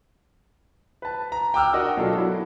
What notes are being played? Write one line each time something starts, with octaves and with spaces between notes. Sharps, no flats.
B4 A5
A#5
G5 D6 E6 F6
D4 F#4 A#4 D#5
B2 F#3 D4 F4 A4
F#3 E4